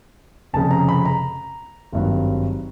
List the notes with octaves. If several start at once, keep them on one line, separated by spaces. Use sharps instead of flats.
F1 F2 C#3 A5
A#5
B5
A#5
G#1 G2 D#3 F#3